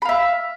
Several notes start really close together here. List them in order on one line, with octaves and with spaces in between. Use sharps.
B5 F5 E5